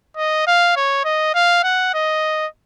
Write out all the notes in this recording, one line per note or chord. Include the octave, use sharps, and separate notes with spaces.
D#5
F5
C#5
D#5
F5
F#5
D#5